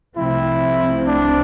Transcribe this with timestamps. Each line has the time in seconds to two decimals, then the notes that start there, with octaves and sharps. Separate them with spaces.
0.16 C2 C3 F3 A3 C4 E4
1.06 D4